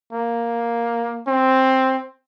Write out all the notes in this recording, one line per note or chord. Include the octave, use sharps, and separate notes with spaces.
A#3
C4